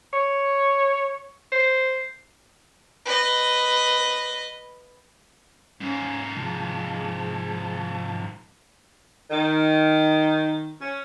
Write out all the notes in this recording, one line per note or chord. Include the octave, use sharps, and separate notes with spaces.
C#5
C5
B4 D#5
G#2 A#3 C#4
C3 F3 G#3 A5
D#3
C#4